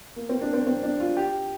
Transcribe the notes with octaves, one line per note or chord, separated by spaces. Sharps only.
A#3
C4
D4
C4
C4
D4
F4
G4